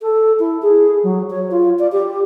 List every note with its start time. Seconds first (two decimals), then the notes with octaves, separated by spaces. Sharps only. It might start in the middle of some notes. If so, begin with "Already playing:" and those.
0.02 A4
0.39 E4
0.62 G#4
1.03 F#3
1.30 C#5
1.51 F4
1.79 D5
1.92 G4